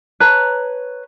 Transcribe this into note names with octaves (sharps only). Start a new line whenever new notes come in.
B4 C#5 A5 A#5